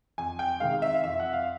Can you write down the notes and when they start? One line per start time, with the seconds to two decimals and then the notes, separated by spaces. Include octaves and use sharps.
0.18 F2 G#5
0.39 G5
0.60 C3 D#3 G#3 F5
0.82 E5
0.94 F5
1.04 F2 E5
1.20 F#5
1.33 F5